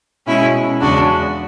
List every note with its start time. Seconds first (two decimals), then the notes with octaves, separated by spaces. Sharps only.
0.27 B2 G#3 C#4 E4
0.81 E2 C#3 G#3 D4 F#4